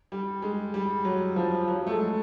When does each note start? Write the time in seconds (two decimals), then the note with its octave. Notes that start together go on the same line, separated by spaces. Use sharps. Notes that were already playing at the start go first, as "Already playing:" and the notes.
0.12 G3
0.42 G#3
0.74 G3
1.05 F#3
1.36 F3
1.68 F#3
1.87 A3
1.91 G#3